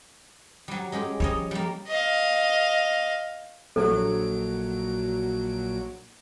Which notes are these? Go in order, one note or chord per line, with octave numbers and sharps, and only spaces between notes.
F#3 G3
G#3 C#4 G4
F3 G3 C#5 D#5
G3 A#3
D#5 F5
A#1 F#3 A4 D7